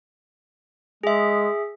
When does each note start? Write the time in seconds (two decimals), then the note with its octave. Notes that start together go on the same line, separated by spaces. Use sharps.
1.04 G#3 G#4 E5